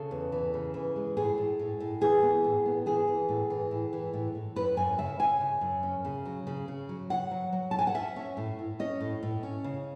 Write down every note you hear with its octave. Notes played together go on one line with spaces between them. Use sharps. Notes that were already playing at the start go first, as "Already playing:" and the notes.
Already playing: C#3 A4
E2
E3
C#3
E3
G#3
A2 G#4
A2
A2
A2
E3 G#4
B3
A2
B3
E3 G#4
E3
A2
E3
A2
E3
A2
A2
F#2 B4
F#2 G#5
C#3 E5
C#3 G#5
C#3
F#2
C#4
C#3
F#3
C#3
C#3
F#3
C#3 F#5
F#3
F#3
A5
A3 G#5
F#5
C#4 E5
C#4
A2
A2
C#4 D#5
A2
A2
C#4
C#3